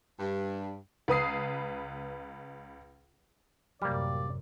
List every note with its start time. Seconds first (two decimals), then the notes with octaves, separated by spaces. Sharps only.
0.19 G2
1.08 C#2 B4 D#6 C7
3.82 A1 F#2 C3 G3 A#3 D5 F6